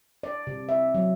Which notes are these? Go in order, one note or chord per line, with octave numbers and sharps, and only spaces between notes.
D5
C3
E5
F#3